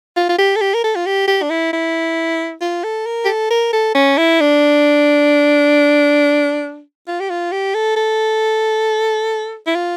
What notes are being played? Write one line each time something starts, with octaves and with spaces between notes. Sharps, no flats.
F4
F4
G4
A4
G4
A#4
A4
F4
G4
G4
D4
E4
E4
F4
A4
A#4
G4
A4
A#4
A4
C#4
E4
D4
F4
G4
F4
G4
A4
A4
E4
F4